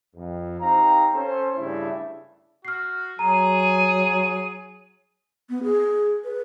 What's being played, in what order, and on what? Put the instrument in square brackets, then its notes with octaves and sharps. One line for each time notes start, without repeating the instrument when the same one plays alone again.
[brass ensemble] F2
C4 D#4 G4 F5 A#5
C#4 A4 C5
G2 C#3 A3 D4 E4
[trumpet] F#4 [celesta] F6 C7
[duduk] F#3 [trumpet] G#4 [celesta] A#5 [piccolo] D#7
[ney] B3
G#4
B4